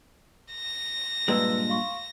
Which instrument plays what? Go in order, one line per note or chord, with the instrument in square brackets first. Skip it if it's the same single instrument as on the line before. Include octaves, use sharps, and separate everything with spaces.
[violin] A#6
[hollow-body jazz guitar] G2 A#2 G#3 [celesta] B4 E6
[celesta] F5 C6 C#6